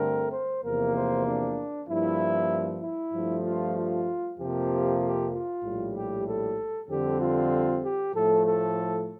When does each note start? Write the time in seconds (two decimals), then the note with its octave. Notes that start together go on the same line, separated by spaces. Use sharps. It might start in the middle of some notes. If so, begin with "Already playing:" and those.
Already playing: G2 D3 A3 C4 A#4
0.31 C5
0.62 E2 C3 F3 A#3 A#4
0.94 C5
1.25 D4
1.87 G2 F3 A#3 E4
2.81 E4
3.13 G2 F3 A3
3.44 F4
3.75 F4
4.38 F2 C3 F3 A#3 G4
5.00 G4
5.32 F4
5.63 A#1 A2 G3
5.94 G4
6.26 A4
6.88 F2 D3 G3 C4 G4
7.20 F4
7.83 G4
8.14 A2 F3 A3 A4
8.45 A4